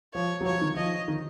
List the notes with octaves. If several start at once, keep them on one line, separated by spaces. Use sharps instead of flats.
F3 C#5
F#3
F3 C#5
D#3
F3 D#5
D#3